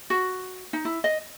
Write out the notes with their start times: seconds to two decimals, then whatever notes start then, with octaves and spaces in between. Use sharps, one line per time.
0.10 F#4
0.73 D#4
0.85 E4
1.04 D#5